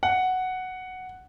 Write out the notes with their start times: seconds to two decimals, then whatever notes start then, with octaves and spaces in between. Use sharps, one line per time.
0.03 F#5